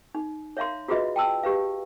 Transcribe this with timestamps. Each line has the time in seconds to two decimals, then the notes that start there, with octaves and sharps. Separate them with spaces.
0.15 D#4
0.57 C#5 E5 F5 A#5 C6
0.88 F4 F#4 G#4 B4 D#5 E5
1.16 G5 A5 E6
1.43 G4 B4 F5